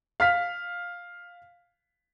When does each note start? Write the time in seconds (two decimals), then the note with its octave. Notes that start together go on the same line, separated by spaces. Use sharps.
0.20 F5 F6 B6